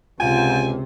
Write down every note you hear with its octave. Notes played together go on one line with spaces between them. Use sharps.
C#2 C3 F4 G#5